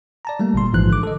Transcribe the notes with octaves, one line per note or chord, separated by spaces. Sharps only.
D5 A5 A#5
G3 A3 A#3
G1 A#2 D3 G3 C6
A1 G#2 E3 F3 F#6
D3 D6
A4 D#5